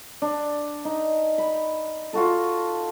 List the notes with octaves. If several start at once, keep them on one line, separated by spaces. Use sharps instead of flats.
D4
D#4
B5
F4 F#4 A4